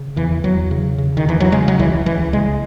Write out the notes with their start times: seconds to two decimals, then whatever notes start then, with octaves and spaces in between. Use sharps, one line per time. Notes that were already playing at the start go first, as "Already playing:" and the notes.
Already playing: C#3
0.16 E2 E3
0.44 E2 F#3
0.71 C#3
0.98 C#3
1.17 D#3
1.25 E2 E3
1.40 F#3
1.52 C#3 G#3
1.68 F#3
1.79 C#2 E3
2.06 C#2 E3
2.33 C#3 G#3